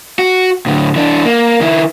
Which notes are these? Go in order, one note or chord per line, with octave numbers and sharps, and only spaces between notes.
F#4
A2 D3
E3 D4
A#3
D#3 E4